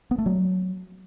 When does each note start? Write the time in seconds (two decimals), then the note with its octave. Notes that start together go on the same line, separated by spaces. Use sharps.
0.11 B3
0.18 A3
0.26 F#3